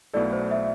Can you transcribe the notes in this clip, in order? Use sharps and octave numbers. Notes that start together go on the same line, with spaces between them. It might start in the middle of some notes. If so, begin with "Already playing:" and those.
B1 B2 A3 E4 A4 D5
C5
E5